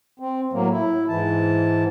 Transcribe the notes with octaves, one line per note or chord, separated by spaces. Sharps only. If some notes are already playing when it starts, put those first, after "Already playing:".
C4
A2 F#3 A#3
E4
G#2 E3 A5